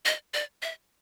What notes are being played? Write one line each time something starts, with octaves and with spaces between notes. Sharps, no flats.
D#5
D5
E5